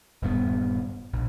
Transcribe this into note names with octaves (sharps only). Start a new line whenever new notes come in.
D#1 G2 B3
A#1